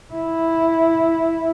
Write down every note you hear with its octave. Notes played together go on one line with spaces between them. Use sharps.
E4